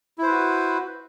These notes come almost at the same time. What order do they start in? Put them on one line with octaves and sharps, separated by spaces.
E4 C5 B4 F#4